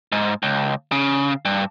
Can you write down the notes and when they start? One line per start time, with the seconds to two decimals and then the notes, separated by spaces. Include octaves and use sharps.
0.12 G#2
0.43 C#2
0.92 C#3
1.45 G2